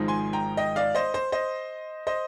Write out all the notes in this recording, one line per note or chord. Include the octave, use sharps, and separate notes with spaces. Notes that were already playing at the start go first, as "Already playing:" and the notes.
Already playing: G#1 G#2 F3 G#3 D#4
G#5 C6
G5 A#5
D#5 G5
D5 F5
C5 D#5
C5
C5 D#5
C5 D#5